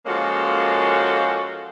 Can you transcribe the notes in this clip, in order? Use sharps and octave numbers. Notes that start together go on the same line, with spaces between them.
F3 G#3 A#3 C#4 F#4 A4